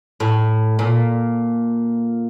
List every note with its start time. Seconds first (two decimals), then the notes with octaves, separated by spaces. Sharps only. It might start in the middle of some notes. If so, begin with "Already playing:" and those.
0.20 A2
0.79 A#2